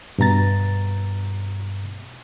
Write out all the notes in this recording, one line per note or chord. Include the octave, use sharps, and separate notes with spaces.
G2 B2 A#5 A6